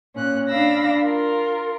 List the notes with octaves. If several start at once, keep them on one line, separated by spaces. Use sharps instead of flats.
A#2 C#4 F#6
D4 F5 B5 E6 A#6
F4 A#4